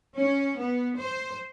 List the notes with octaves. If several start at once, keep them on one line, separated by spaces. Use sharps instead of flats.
C#4
B3
C5